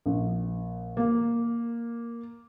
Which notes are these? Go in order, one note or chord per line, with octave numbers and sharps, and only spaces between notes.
A#1
A#3